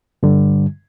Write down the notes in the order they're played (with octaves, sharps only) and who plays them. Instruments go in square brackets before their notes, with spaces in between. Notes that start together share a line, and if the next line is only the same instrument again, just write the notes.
[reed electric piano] G2 D3 G3